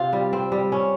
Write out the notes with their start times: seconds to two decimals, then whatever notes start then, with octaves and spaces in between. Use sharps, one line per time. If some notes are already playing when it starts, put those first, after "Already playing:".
Already playing: C3 C4 F4
0.13 G3
0.33 C4
0.52 G3
0.72 C#4